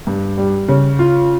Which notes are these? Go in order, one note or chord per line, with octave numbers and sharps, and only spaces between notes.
G2
G3
C#3
F4